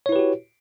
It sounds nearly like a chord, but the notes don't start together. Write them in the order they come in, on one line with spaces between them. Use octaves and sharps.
C#5 E4 B4 G4 F#4